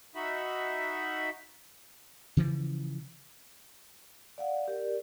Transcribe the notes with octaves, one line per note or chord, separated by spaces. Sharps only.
D#4 F#4 E5 B5
C#3 E3 F3
D5 F5 F#5
G4 A#4 D5